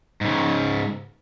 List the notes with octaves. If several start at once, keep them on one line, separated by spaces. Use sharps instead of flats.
G#2 C#3